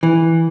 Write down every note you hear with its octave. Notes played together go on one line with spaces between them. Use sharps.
E3